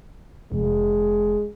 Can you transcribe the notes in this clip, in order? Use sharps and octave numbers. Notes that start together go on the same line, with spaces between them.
F1 G#3